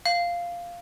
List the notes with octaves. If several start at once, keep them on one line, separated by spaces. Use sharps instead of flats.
F5